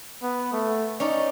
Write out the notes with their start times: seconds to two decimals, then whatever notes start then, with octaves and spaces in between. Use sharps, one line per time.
0.23 B3
0.53 A3
1.00 C#4 D#4 D5